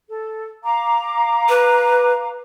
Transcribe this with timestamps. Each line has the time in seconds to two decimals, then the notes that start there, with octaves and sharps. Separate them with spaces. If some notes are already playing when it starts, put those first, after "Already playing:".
0.07 A4
0.64 F5 A#5 D6
1.49 B4